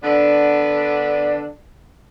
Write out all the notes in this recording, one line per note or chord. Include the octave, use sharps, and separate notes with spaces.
D3 B3 D4